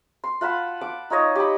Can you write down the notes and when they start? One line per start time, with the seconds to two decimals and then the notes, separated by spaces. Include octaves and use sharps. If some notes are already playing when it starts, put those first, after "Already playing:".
0.24 C6
0.41 F4 F#5 A5 B5
0.81 F#5 A5 D6
1.10 D#4 F4 C#5 D#5
1.35 G4 B5